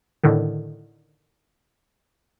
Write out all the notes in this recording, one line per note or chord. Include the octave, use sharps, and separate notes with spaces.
A2 D3 D#3